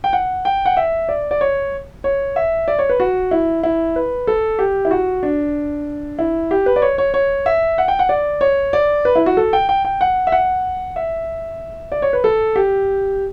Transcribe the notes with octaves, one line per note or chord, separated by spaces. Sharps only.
G5
F#5
G5
F#5
E5
D5
D5
C#5
C#5
E5
D5
C#5
B4
F#4
E4
E4
B4
A4
G4
E4
F#4
D4
E4
G4
B4
D5
C#5
C#5
C#5
E5
F#5
G5
F#5
D5
C#5
D5
B4
E4
F#4
A4
G5
G5
G5
F#5
E5
F#5
E5
D5
C#5
B4
A4
G4